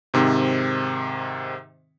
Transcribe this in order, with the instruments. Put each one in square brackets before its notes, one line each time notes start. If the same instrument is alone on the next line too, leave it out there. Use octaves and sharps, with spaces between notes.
[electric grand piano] G#2 C3 D#3 C4